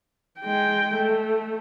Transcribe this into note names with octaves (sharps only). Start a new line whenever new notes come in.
G#3 G5
A3